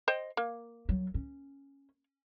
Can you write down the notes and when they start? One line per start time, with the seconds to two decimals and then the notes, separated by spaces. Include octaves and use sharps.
0.08 C5 D#5 G5
0.37 A#3
0.89 F#3
1.14 C#4